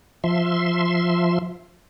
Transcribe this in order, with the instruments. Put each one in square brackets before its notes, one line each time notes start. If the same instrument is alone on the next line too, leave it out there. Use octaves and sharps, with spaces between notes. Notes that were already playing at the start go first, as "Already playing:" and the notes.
[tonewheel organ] F3 E5 C6